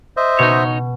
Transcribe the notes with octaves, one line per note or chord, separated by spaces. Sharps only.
C5 D#5 E5
B2 D#4 C#5